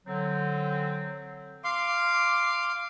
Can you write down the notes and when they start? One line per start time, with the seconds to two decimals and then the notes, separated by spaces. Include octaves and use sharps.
0.06 D3 F#3 C4
1.64 F5 C6 D6